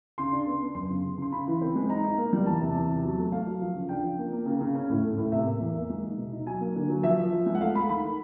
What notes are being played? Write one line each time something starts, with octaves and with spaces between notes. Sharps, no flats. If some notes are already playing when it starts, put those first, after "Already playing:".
C#3 C6
D4
B3
B3
F#2 C6
C#3
C#3
C#3 C6
C#3 B5
E3
C4
G#3
D#4 A#5
D#4
A#3
G3
E2 A5
C3
E2
C3
F#3
A3
A3 F5
F#3
F3
C#3
D4 G5
F3
A#3
A#3
C#3
C#3
C#4
A2
A3
A2
C3 E5
A#3
E2
A#3
G#3
D#4
B2
D#4
F#3 G#5
A#3
D3
F#3
F3 E5
F3
F3
G#3
F#5
A3 F5
A3 B5
D#3 B5
D#3